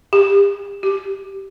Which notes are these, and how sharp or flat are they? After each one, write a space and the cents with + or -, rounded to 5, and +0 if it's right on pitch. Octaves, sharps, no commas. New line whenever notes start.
G4 +35
G4 -15